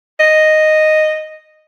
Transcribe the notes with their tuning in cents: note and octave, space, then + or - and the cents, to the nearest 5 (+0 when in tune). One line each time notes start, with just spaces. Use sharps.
D#5 -5